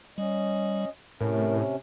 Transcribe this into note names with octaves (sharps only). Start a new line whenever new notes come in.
G3 C#4 D#5
A2 C3 C#4 A#4